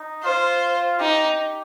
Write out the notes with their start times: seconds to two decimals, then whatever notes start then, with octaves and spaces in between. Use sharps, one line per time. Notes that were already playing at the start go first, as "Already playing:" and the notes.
Already playing: D#4
0.23 F4 C5
0.99 D#4 G4